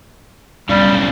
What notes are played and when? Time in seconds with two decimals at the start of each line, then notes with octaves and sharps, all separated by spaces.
0.69 B1 C#3 G3